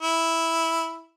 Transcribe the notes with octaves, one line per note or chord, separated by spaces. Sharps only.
E4